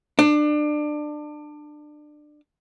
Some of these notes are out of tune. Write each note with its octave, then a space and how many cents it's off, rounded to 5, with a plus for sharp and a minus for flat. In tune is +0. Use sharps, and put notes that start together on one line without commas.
D4 +25